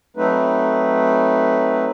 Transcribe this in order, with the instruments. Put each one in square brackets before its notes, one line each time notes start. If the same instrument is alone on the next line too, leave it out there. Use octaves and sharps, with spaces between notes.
[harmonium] F#3 A3 C4 D#4 B4